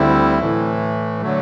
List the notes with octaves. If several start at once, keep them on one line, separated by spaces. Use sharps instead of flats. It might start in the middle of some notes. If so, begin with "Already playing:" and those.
Already playing: D2 D3 G3 C4 E4
A2 E3 A3
D3 F#3 A3